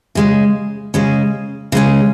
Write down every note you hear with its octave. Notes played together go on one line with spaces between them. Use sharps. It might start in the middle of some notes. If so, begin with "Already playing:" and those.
C#3 G#3 C#4
C#3 G#3 C#4
C#3 G#3 C#4